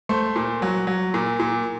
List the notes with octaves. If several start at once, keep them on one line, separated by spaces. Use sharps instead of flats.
A3 C5
A#2
F#3
F#3
A#2
A#2